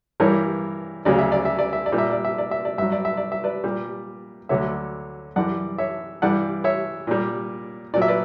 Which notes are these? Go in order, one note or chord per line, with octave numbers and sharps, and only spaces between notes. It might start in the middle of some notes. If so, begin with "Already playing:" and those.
G2 E3 G3 A#4 C#5
D2 C#3 F#3 D5
E5
D5
E5
D5
E5
D5
A#2 G3
E5
D5
E5
D5
E5
D5
G2 F#3 E5
D5
E5
D5
E5
B4 D5
A#2 G3
D2 D3 F#3 C#5 E5
F#2 E3 G3 D5 F#5
C#5 E5
G2 E3 G3 D5 F#5
C#5 E5
A#2 G3
A#2 F#3 D5
E5
B4 D5